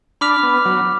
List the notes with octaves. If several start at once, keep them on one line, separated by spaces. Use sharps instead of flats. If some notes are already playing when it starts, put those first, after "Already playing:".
D4 B5 D6 F6 B6 F7
B3
F#3